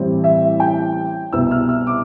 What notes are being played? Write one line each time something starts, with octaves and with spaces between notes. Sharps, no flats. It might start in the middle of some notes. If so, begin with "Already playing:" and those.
Already playing: A1 A2 G3 C4
E5
G5
C2 B2 B3 E6
F6
E6
D6